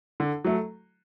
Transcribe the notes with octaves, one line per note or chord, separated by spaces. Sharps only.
D3
F#3 A3